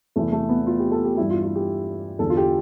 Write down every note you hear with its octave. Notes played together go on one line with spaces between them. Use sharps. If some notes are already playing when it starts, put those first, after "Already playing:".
E2 C3 E3 A3
A3
B3
F4
G4
A4
G4
G2 E3 E4
F4
F4
G4
E2 D3 A4
F4
G4